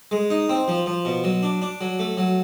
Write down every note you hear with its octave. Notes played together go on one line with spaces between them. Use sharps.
G#3
D#4
C4
F3
F3
B2
F#3
D4
D4
F#3
A3
F#3